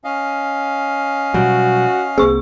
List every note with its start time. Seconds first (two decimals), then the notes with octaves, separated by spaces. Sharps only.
0.04 C#4 D#5 F5
1.34 B2 F#3 G3 F#4
2.18 C2 A#3 C4 G#4 C#6